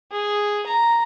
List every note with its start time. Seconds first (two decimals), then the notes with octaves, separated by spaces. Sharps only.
0.11 G#4
0.67 A#5